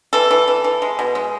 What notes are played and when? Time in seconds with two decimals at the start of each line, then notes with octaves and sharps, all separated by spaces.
0.13 E3 A4
0.31 E3
0.48 E3
0.64 E3
0.82 G#3
0.99 B2
1.15 G#3